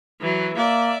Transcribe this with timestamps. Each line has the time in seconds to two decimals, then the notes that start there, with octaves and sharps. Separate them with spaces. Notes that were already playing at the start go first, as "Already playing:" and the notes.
0.20 E3 F#3
0.57 A#3 D5 E5